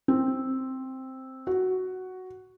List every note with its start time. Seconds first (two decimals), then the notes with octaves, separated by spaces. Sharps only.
0.08 C4
1.47 F#4